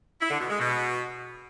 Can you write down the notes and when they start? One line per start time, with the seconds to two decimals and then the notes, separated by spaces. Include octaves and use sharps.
0.21 E4
0.30 D3
0.40 B2
0.50 G#3
0.60 B2